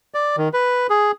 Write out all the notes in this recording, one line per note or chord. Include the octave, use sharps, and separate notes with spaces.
D5
D#3
B4
G#4